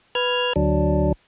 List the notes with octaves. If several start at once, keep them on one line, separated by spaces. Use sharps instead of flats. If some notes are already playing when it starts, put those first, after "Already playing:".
B4 F6 G#6
D2 F#3 D4